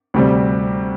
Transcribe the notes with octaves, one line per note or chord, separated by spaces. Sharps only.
D2 C3 G3